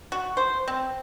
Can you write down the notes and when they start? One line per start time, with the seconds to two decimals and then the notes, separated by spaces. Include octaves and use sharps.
0.12 F#4
0.37 C5
0.68 C4